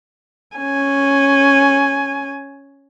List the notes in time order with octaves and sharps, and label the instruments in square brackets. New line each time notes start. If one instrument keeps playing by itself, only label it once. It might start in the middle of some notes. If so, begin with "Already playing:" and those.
[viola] C#4 G#5